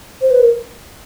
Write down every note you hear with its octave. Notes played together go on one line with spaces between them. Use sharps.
C5
B4
A#4